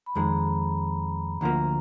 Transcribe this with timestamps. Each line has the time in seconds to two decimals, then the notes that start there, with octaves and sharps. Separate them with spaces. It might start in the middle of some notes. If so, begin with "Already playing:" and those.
0.06 B5
0.15 F2 D#3 G#3 A#5
1.41 D2 D3 F3 A#3 A#5